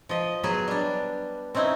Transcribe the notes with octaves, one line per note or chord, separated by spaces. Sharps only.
F3 D#5
F#3 B3 G#4 B4
G3 D4
C4 C#4 D#4 E4